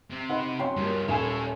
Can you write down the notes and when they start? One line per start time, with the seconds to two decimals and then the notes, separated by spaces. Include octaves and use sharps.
0.11 C3 C4
0.30 D#4 B4 C5 F#5
0.59 F#3 C#4 F#4 G5 C6
0.76 G2 F3 G3 A#3
1.08 D#1 A4 C#5 E5 G#5